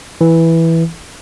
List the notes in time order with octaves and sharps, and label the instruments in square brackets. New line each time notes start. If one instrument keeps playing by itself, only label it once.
[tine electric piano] E3